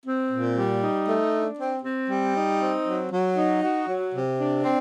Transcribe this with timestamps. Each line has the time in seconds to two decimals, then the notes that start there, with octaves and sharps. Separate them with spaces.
0.06 C4
0.31 A#2
0.57 G3
0.82 D#4
1.08 A3
1.33 D4
1.58 C4
1.84 C4
2.09 G3
2.35 D#4
2.60 C4
2.86 F#3
3.11 F#3
3.37 D#4
3.62 F#4
3.88 F#3
4.14 C3
4.39 D4
4.64 C4